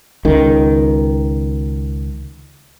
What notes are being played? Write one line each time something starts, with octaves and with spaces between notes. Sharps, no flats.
C#2 D#3